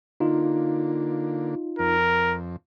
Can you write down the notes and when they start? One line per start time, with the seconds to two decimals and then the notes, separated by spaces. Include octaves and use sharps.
0.20 D3 A#3 D#4 F4
1.79 F2 A#4